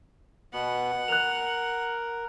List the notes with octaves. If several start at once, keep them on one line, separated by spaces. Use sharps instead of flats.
B2 B3 F#5
A#4 F#6 F7